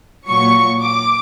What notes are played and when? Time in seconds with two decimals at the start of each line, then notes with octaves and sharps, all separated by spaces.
0.28 A#2 F#3 C#6
0.81 D6